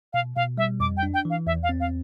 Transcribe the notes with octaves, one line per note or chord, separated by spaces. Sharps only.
B2 F5
B2 F5
G3 E5
F2 D6
G5
D4
G5
E3
F5
E2 E5
F5
C4
F5